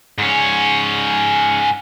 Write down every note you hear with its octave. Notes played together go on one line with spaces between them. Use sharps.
G#2 C#4